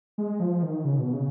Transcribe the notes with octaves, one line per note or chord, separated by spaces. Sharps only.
G#3
F3
D#3
C#3
B2
C#3